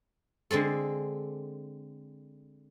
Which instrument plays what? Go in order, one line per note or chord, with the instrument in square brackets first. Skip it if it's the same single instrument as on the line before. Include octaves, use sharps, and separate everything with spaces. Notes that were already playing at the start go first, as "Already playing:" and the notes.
[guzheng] D3 G#3 C4 A4